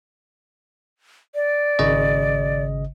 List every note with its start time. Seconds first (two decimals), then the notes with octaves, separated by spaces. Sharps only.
1.35 D5
1.79 G#1 C#3 D#5